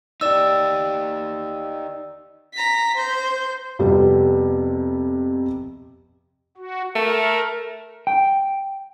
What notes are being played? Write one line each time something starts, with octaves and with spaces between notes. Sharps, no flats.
D#4 G4 D5 E6
A#5 B6
C5 G6
F2 C3 G3 B3
F#4
A3 A#4
G5